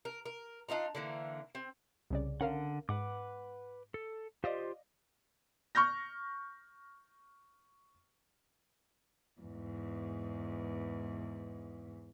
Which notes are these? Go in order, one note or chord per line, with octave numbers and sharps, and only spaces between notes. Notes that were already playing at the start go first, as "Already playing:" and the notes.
A#4
A#4
D4 D#4 F4 A#5
D3 E3 A#3
C4
C2 C#3 D5
D3 C#4 A#4 F5 F#5
G#2 B4 F#5 D6
A4
F4 G4 C5 D5 D#5 F5
C#6 F6 G6 A#6
E2 G#2